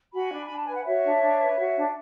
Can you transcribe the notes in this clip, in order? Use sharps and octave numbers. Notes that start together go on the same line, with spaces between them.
F#4 G#5 B5
D4
D4 B5
A5
B4 G#5
F#5
F#4 C#5 E5
D4
D4
B4
F#4
D4